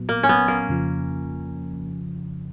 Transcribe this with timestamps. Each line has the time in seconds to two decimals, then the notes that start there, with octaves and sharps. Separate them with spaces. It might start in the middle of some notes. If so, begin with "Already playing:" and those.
Already playing: A#2 F#3 B3
0.09 A#3
0.23 C#4
0.29 B3
0.48 A#3
0.68 F2 C#3 F3